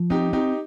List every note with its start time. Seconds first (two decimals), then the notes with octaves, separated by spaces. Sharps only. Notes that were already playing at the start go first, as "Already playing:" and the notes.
Already playing: F3
0.10 C4 D#4 G4
0.33 C4 D#4 G4